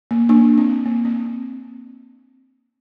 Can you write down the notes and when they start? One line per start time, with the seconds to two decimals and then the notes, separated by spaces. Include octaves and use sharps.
0.11 A#3
0.29 A#3 D4
0.58 C4
0.86 A#3
1.05 C4